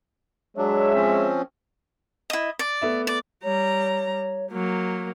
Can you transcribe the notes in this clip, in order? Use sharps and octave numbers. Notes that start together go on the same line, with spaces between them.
F#3 G#3 D4 C#5 E5
F3 C4 C#4
E4 D#5
D5
A3 B3 E5
D5
G3 C#5 A#5
F#3 A#3